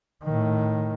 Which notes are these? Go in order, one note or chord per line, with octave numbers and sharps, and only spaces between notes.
A2 D#3